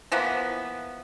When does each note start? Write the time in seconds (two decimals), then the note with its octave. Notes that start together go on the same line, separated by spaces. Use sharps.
0.12 E3 F3 A#3 B3